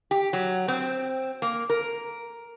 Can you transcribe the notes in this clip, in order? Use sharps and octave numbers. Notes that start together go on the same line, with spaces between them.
G4
F#3
C4
A#3
A#4